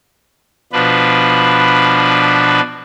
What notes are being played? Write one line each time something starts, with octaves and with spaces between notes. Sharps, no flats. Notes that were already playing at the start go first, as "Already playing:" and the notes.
B2 F3 D4 B4